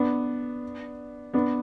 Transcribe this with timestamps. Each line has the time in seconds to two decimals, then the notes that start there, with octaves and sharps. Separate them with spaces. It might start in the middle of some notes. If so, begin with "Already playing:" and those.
Already playing: B3 D4
1.34 B3 D4